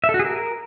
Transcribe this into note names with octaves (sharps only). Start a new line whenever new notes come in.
E5
A4
F#4
G#4
A#4